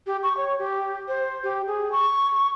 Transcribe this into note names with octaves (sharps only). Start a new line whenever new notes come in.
G4
C#6
C#5
G4
C5
G4
G#4
C#6